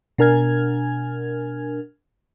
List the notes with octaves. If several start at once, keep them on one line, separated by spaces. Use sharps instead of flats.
B2 D4 A#4 G#5 F6 G#6